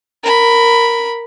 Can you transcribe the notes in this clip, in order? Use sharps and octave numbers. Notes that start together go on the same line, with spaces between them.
A#4 B5